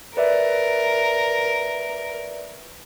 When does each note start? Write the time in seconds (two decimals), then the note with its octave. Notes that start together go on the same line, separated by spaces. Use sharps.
0.17 A#4 B4 D5 E5